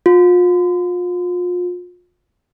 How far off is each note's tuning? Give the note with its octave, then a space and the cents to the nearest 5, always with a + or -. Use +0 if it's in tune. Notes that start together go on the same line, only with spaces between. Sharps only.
F4 +35